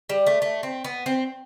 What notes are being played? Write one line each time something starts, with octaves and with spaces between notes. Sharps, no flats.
G3
A3
A3
C4
B3
C4